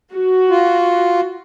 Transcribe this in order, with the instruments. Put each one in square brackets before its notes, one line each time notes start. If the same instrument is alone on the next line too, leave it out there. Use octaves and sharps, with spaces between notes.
[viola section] F#4
[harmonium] F4